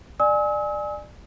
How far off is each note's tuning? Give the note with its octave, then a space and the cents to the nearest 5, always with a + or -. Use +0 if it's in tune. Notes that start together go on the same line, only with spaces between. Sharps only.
D5 +25 G#5 +0 E6 -45